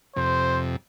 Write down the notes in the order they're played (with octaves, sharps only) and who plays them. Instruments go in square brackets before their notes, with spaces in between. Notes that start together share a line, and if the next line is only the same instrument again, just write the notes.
[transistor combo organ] F2 C3 [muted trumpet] C5